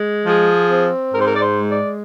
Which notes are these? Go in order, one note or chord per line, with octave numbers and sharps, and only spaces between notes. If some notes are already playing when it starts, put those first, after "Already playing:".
Already playing: G#3
F3 G#4
C4
G#2 A#4
C5
A#4
D5
C5
G#3
D5